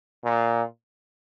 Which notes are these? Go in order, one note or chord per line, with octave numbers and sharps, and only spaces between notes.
A#2